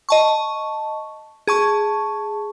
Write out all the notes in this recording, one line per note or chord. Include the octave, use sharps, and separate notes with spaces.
D#5 A5 C#6
G#4 A5 C#6